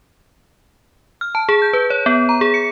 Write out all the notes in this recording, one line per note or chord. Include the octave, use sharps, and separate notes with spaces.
F6
A5
G#4
G6
B4
C#5
B3
A#5
G#4
C#7